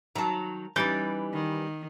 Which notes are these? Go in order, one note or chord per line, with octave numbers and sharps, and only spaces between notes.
D#3 F#3 A5 A#5
E3 G3 C#4 D#4 B4 G6 A6
D#3